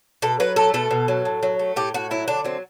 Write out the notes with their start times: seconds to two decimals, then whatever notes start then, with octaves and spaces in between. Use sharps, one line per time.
0.22 B2 A4
0.40 F#3 B4
0.56 A3 A4
0.74 B2 A4
0.91 B2
1.08 F#3
1.25 A2
1.43 F#3
1.59 A3
1.76 A2 G4
1.94 A2 F#4
2.11 F#3 E4
2.28 D3 D4
2.45 F#3 C4